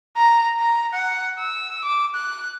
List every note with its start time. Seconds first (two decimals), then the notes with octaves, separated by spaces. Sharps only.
0.17 A#5
0.59 A#5
0.93 F#5
1.40 E6
1.84 D6
2.15 F#6